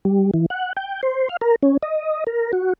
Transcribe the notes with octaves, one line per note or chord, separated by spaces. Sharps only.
G3
E3
F#5
G5
C5
F5
A#4
C#4
D#5
A#4
F#4